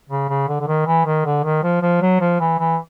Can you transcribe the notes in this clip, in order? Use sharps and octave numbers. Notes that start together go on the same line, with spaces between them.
C#3
C#3
D3
D3
D#3
E3
D#3
D3
D#3
F3
F3
F#3
F3
E3
E3